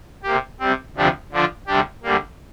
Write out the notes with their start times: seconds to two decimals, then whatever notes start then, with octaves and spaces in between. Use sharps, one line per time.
0.23 C3 A#3 G4
0.60 C3 G3 C4
0.96 D2 C3 F3 D4 G4
1.32 D3 F3 D4 F4
1.67 D2 C3 G3 D4 G4
2.03 D2 D3 G3 A#3